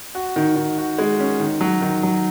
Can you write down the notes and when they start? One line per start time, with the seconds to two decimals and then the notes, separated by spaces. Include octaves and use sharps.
0.15 F#4
0.36 D#3
0.56 D#3
0.78 F#4
0.98 G#3
1.20 C#4
1.40 D#3
1.61 F#3
1.81 D#3
2.03 F#3